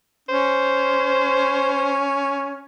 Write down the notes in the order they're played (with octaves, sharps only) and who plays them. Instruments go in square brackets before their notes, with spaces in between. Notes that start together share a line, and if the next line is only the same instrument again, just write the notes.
[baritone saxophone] C#4 [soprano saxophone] C5